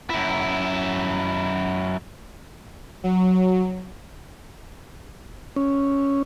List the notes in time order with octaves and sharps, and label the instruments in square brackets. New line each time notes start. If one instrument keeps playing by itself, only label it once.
[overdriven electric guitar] F#2 E4
[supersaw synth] F#3
[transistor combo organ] C#4